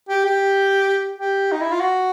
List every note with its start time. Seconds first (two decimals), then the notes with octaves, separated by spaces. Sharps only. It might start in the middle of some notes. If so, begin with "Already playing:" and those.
0.09 G4
0.25 G4
1.18 G4
1.52 D#4
1.61 E4
1.71 F4
1.81 F#4